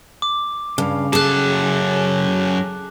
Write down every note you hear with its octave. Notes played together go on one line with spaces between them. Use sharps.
D6
G2 C#3 F5
F#2 G#4 A4 A5 D6 F#6